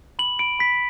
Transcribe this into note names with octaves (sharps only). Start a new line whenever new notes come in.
B5 F#7
B5 D7
B5 B6